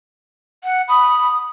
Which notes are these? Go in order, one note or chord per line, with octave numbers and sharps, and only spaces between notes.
F#5
B5 D#6